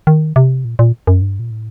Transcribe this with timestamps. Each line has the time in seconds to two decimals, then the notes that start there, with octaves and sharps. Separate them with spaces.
0.07 D#3
0.36 C3
0.65 A#2
0.79 A#2
1.07 F#2
1.22 G2
1.39 A#2
1.51 A2